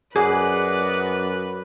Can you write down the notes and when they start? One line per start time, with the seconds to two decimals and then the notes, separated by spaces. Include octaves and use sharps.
0.16 F#2 G#4 B4 D5 D#5 F#5